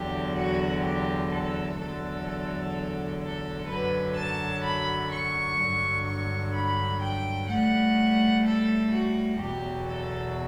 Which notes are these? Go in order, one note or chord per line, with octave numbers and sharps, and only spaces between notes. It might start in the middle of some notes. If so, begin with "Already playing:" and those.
Already playing: E2 D3 F#3 G4
F#4
G4
A4
E2 D3 F#3 A4
A4
A4
F#2 D3 F#3 B4
A5
B5
C#6
G2 D3 F#3
C#6
B5
G5
A2 G3 F#5
A4
F#4
E2 B2 F#3 G4
A4